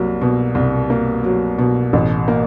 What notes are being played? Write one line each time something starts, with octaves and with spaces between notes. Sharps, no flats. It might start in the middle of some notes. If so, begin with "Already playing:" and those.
Already playing: C2 F#3 A#3
B2
C2
A#3
F#3
B2
A1
A#3